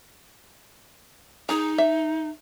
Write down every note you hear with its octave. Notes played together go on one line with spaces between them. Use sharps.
D#4 G#4 A#5
E5